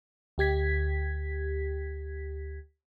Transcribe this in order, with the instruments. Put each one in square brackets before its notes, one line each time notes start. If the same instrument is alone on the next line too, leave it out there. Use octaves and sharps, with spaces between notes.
[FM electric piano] D2 G4 G#6 B6